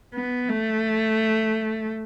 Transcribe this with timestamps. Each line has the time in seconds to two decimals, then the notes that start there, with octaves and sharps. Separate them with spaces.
0.15 B3
0.49 A3